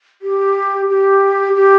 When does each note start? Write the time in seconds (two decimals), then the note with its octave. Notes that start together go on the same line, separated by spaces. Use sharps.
0.21 G4
0.88 G4
1.55 G4